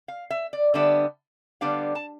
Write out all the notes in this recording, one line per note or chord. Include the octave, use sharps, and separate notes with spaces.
F5
E5
D5
D3 G3 B3 D4 E5
D3 G3 B3 D4 F5
A5